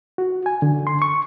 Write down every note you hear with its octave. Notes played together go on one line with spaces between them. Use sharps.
F#4
G#5
D3
C6
C#6